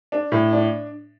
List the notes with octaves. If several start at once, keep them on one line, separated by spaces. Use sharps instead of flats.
D4
A2
D4